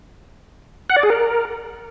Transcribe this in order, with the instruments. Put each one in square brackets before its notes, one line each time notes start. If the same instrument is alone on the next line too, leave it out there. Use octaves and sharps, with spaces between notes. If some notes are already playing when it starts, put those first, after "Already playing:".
[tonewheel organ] F#5
D5
G#4
A#4